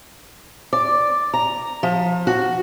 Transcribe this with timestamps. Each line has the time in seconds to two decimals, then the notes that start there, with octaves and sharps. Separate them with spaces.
0.73 D5
1.34 A#5
1.83 F3
2.27 F#4